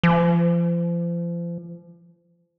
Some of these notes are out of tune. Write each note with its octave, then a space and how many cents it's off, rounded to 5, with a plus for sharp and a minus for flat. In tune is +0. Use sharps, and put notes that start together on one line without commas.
F3 -35